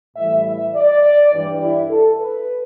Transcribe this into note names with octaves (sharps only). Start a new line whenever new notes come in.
A2 E3 G3 E5
E5
D5
G2 E3 G3
E4
A4
B4